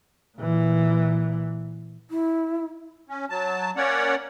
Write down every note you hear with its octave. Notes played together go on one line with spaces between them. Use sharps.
A#2 E3
E4
C#4
F#3 A5
A#3 C#4 C#5 D5 F#5